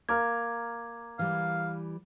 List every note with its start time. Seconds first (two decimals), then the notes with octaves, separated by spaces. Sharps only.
0.09 A#3 A#5 D6 F6 G#6
1.19 E3 G3 F5